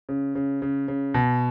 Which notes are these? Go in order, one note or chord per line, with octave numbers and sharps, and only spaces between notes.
C#3
C#3
C#3
C#3
B2